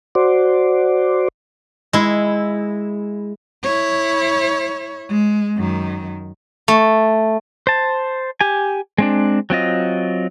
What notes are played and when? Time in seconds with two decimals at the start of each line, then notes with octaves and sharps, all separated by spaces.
0.15 F#4 C5 D5
1.93 G#3 E4
3.63 E4 C#5
5.09 G#3
5.56 F#2 D#3
6.68 A3
7.67 C5 A5
8.41 G4 G#5
8.98 G#3 C4 D4
9.50 F#3 C4 F4 D#5